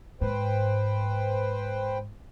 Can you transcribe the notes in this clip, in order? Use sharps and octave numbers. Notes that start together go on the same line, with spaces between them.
G#2 B4 C5 G5